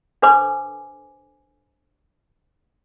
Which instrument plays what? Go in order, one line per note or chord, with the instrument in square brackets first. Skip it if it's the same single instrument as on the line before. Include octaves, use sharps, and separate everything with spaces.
[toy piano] D4 A4 B4 C5 G#5 D6